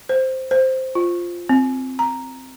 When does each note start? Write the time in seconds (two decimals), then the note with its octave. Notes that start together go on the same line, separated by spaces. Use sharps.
0.09 C5
0.51 C5
0.95 F4
1.49 C4
1.99 A#5